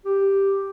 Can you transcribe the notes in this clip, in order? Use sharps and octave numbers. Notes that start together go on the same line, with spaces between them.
G4